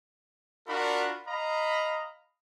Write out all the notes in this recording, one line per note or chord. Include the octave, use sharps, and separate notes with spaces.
D4 F4 F#4 A#4 B5
D#5 F5 A#5 B5